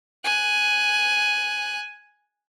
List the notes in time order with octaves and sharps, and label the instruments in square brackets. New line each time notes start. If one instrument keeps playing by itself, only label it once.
[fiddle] G#5 F#6